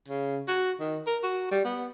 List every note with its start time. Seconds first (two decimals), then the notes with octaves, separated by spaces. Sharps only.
0.08 C#3
0.48 F#4
0.80 D#3
1.07 A#4
1.23 F#4
1.51 G3
1.64 B3